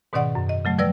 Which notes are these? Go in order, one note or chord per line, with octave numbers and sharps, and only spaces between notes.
G#2 B2 D#3 C#4 D5 F#5
F#2
D#5
C#3 F#3 A3
F3 G3 B4 D5 E6 A#6